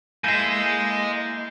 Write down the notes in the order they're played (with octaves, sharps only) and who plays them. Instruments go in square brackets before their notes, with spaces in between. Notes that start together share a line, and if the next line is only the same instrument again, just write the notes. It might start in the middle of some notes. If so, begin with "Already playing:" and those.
[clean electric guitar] A#3 E4 A4 [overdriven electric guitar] D#5 G#5 [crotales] G6 C7